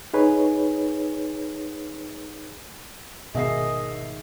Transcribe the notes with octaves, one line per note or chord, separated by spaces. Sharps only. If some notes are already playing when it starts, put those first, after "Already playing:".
D#4 G#4 B4 C#5
G#1 B2 G#4 D#5 E5 C7